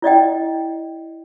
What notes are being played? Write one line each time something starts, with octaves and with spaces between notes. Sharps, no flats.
E4 D5 D#5 G5